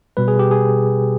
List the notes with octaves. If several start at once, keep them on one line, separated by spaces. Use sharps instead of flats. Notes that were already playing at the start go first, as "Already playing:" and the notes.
B2 G3 B4
G#4
G4
G#4